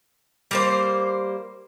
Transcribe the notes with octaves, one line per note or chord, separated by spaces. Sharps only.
G3 A#3 C5